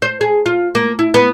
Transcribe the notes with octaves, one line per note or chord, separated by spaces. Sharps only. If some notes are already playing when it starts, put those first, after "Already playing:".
C5
G#4
F4
A#3
E4
B3